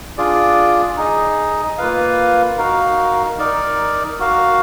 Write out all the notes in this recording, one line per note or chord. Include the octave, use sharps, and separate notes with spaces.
D4 F4 G#4 D5
D#4 G#4 D#5
A#3 F4 B4 F5
D#4 F#4 A#4 F5
D#4 A#4 D5
F#4 A#4 F5